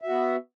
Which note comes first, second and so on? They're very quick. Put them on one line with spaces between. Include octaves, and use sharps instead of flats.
E5 F#4 B3